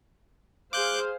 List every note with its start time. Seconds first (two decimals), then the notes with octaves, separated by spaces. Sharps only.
0.73 G#4 C5 F5 D6 F#6 G6